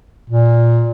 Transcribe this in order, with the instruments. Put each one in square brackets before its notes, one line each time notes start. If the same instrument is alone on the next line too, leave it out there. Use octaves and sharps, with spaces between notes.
[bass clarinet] A#2